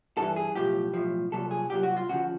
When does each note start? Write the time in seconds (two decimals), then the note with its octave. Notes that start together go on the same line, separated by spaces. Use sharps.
0.17 G2 E3 A4
0.36 G#4
0.55 B1 A2 F3 G4
0.94 B1 A2 F3
1.32 C2 A#2 F#3 A4
1.51 G#4
1.70 C2 A#2 F#3 G4
1.83 F#4
1.97 F4
2.09 D2 C#3 F3 F#4